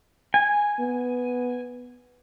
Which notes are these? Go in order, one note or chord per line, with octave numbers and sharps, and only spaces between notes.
G#5
B3